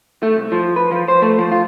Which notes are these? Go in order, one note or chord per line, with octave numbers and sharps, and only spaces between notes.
A3
C2
F3
B4
F3
C5
A3
F3
F4